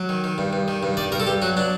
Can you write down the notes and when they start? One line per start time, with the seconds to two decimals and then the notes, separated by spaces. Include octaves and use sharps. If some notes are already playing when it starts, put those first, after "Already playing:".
Already playing: F#3
0.09 D#3
0.24 D#3
0.38 G2
0.53 G2
0.68 D#3
0.83 G2
0.97 D#3 D5
1.12 G2 A#4
1.20 A4
1.27 G2 G4
1.42 F#3 F#4
1.56 F#3 D4